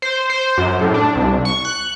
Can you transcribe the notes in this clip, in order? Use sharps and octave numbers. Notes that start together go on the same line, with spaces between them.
C5
C5
F#2
A2
D4
C2
C#6
F#6